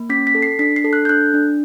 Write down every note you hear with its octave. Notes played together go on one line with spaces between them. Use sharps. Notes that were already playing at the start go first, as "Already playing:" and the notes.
Already playing: A#3
C#4 B6
B6
A4
C7
D4 B6
C7
A4
F#6
G6
D4 F#6
D4